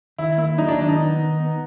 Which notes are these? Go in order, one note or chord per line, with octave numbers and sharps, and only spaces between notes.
D#3 E4
A#3 E4
F#3 D#4
D4
D#3 D4
D#4
B3
D#3
B3